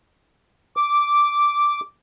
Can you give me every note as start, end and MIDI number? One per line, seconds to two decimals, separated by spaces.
0.77 1.80 86